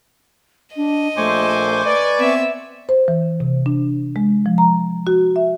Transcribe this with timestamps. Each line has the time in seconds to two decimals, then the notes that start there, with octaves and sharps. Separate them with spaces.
0.76 D4 D#5
1.17 A#1 A#2 A3 C5 G#5 C#6 D6
1.85 B4 D5
2.19 B3 C4 E5
2.89 C5
3.08 E3
3.40 C3
3.66 D4
4.16 G#3
4.46 F3
4.58 A#5
5.07 F#4
5.36 E5